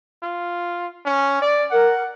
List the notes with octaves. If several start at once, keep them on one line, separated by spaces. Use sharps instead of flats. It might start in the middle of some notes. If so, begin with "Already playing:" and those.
F4
C#4
D5
A#4 F#5